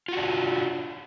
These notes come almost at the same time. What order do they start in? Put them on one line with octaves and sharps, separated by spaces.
F4 F#4 D4